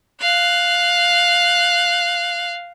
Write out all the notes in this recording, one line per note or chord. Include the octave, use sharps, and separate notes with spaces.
F5 F#6